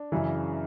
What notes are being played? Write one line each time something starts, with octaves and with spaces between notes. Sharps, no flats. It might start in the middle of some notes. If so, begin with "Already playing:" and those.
Already playing: D4
F#2 C#3 E3